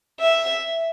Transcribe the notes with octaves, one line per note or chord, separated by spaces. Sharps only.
E5